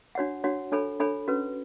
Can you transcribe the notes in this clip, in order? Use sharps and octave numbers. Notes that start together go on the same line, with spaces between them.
D4 F#4 C#5 F#5
D4 F#4 C#5 F#5
D4 A4 C#5 G#5 B5
D4 A4 C#5 G#5 B5
C#4 F#4 B4